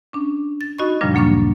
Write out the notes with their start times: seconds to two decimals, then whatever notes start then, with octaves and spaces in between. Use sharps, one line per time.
0.13 C#4 D4
0.61 A6
0.78 D#4 F#4 D#5 B5 C#6
1.01 F#2 A#2 C#3 F3 G3 D4
1.14 D2 F#3 A#3 D4 C#6 A6